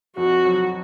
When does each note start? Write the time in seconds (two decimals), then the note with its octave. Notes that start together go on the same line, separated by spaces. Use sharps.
0.17 F2 F#4
0.45 F#3